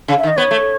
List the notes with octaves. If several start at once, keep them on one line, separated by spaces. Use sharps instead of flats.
C#3
E5
D#3
D#5
B3 C#5
A3